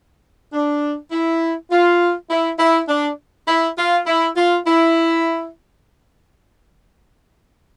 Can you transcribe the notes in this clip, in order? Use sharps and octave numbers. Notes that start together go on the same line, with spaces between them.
D4
E4
F4
E4
E4
D4
E4
F4
E4
F4
E4